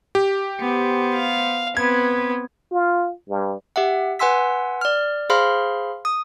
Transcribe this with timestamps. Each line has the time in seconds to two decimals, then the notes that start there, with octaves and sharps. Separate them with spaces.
0.15 G4
0.60 B3 C5
1.14 F5
1.77 B3 C4 B4 G#6
2.71 F4
3.29 G2
3.76 G4 E5 F#5
4.19 B4 F#5 G#5 C6 E6 B6
4.81 D5 F6
5.30 G#4 C5 F5 B5 C6 F6
6.05 D#6